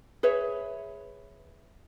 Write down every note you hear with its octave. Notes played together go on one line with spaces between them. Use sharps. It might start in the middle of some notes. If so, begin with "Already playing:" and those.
G#4 B4 C#5 E5